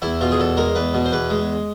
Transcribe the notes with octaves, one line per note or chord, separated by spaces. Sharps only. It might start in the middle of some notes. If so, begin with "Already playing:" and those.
E2 E4
B2 F4
G#4
E2 A4
G#3 A#4
E2 B4
B2
C5
E2 B4
G#3